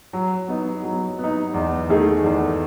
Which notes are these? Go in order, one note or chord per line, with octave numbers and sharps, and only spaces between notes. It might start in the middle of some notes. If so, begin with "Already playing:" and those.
F#3
B3 D#4
F#3
B3
D#4
E2
D#3 A3 D#4 G#4
E2